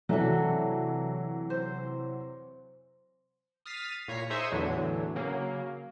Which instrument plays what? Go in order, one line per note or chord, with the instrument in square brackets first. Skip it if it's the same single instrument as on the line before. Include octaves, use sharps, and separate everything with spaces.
[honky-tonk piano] C3 E3 F#3 [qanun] A3 D4 F#4
[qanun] C5
[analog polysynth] D#6 F6 A6 B6 C7 D#7
A#2 C#5 A#5 B6 C7
D#4 G#4 C5 E5 C#6 D#6
E2 A2 D3 E3 F#3
C#3 F#3 A#3